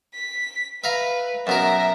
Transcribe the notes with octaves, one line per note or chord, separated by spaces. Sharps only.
B6
B4 E5 F5 A#5
F#2 B2 A#4 E5 A#5